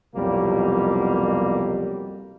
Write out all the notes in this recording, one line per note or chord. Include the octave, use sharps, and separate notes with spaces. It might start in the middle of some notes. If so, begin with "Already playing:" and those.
C2 F2 B2 F#3 G3 A#3